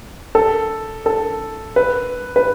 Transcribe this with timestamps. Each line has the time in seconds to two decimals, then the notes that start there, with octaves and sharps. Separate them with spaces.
0.35 A4
1.06 A4
1.76 B4
2.36 B4